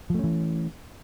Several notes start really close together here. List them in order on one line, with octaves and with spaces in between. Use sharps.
F3 A3 C#4 E3